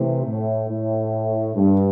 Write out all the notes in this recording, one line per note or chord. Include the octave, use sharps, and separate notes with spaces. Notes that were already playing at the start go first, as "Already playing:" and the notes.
Already playing: C3 E3 A3
A2
A2
G2